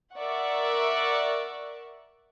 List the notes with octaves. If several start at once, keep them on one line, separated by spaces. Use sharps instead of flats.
A#4 D5 E5 F#5 C#6